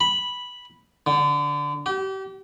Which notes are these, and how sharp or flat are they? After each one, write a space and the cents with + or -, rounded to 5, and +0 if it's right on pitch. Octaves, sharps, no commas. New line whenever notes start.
B5 -5
D3 -15
G4 -35